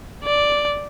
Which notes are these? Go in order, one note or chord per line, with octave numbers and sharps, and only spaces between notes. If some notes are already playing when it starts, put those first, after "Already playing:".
D5